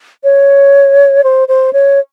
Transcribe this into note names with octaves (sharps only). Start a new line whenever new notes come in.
C#5
C5
C5
C#5